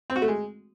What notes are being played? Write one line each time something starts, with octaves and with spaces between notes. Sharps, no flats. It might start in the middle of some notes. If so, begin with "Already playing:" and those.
C4
F#4
A3
G#3